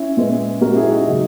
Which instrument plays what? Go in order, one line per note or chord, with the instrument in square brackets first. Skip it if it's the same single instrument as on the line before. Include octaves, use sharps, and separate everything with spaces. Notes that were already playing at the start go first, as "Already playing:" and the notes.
Already playing: [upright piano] C#4 E4
A#2 G#3 B3
A#2 G#3 C#4 F#4 A#4
E4 G#4
D#4 F#4
C#3 F#3 D#4